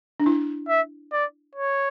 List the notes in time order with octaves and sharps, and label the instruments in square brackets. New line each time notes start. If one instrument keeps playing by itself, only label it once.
[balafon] D4
E4
[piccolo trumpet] E5
D5
C#5